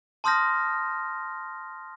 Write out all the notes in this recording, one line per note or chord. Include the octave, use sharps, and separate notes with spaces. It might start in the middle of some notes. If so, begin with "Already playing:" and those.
A5 C6 D#6 F6 G6 A#6